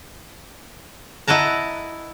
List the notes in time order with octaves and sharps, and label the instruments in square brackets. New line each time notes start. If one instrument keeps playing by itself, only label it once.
[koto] E4 D#5 F#5 A5 A#5